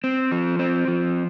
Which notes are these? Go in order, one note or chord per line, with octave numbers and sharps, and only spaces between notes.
C4
F3
C4
F3